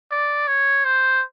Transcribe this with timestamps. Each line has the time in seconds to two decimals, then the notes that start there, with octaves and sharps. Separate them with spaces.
0.11 D5
0.48 C#5
0.85 C5